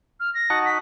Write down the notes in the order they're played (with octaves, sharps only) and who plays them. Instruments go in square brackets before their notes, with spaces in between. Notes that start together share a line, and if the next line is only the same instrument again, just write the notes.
[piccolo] F6
A#6
[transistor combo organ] D#4 F#4 [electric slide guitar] F#5 A5
[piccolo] B6